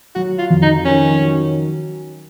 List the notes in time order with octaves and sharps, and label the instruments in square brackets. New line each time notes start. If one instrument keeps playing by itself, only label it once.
[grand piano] F#3 [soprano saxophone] F#4
[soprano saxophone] F4
[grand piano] F2
[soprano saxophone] D#4
[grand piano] D#3 [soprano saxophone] C#4
[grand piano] F#3